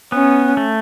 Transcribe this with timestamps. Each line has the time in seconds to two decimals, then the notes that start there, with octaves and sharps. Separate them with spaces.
0.12 B3 C#4
0.57 A3